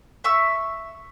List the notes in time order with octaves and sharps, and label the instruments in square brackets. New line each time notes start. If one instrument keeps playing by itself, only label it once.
[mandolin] E5 C#6 E6